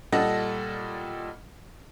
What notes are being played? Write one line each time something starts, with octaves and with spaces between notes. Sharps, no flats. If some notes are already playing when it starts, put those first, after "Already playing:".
A#2 G3 A4 D#5 F#5 A#6